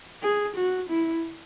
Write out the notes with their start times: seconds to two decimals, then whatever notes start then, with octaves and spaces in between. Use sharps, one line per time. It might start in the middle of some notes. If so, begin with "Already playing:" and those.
0.23 G#4
0.56 F#4
0.89 E4